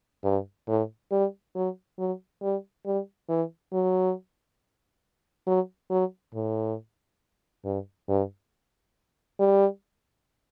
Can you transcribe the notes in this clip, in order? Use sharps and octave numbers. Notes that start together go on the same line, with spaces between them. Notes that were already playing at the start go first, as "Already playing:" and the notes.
G2
A2
G3
F#3
F#3
G3
G3
E3
F#3
F#3
F#3
A2
G2
G2
G3